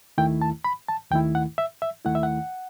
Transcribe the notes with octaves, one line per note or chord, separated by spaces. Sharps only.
D#2 D#3 A3 E4 G5
A5
B5
A5
D#2 D#3 A3 E4 G5
F#5
E5
E5
D#2 D#3 A3 E4 F#5
E5
F#5